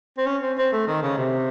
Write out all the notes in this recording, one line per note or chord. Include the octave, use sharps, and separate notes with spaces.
C4
C#4
C4
C4
A3
D#3
C#3
C3